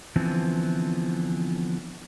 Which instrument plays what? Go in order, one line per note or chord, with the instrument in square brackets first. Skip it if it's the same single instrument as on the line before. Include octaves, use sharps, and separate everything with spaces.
[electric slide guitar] D3 E3 F3 B3 C4